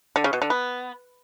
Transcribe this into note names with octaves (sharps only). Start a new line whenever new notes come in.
D3
C#3
B2
D3
B3